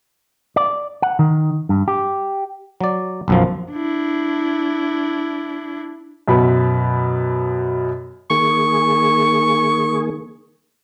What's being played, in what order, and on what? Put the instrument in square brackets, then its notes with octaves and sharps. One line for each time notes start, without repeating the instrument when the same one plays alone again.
[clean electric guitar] D5
F#5
D#3
G2
G4
[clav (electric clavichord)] F#3 D5
B1 F#2 F3
[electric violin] D4 E4
[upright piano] F#2 B2 B5
[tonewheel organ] D#3 A#3 G#4 [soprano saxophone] C#6